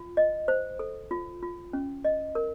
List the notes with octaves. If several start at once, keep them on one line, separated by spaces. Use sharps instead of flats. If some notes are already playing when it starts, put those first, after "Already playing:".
Already playing: F4
D#5
C5
A4
F4
F4
C#4
D#5
A#4